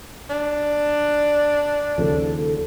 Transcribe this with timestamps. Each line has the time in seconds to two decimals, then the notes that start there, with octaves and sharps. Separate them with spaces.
0.30 D4
1.98 D#2 C#3 F3 A4